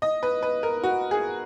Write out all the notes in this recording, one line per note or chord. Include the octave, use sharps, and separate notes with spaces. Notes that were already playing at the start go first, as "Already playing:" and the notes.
D#5
B4
B4
A#4
F#4
G#4